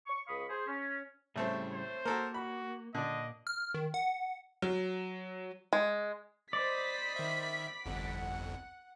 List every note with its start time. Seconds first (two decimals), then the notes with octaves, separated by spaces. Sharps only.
0.07 C#6
0.27 C#2 F5 B5 C#6 D#6
0.50 G#4 C5
0.67 C#4
1.36 A1 A2 C#3 G3 A3 C4
1.74 C5
2.05 A#3 F#4 A4 A#4
2.34 F#4 B5
2.95 A#2 D3 D5 D#5
3.47 F6
3.74 D#3
3.94 F#5
4.62 F#3
5.73 G#3
6.53 C5 D5 D#5 B5 B6
7.16 D#3 E5
7.85 G1 C2 F2 F#5